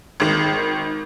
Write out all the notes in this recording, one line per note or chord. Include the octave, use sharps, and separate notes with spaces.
G#1 D#3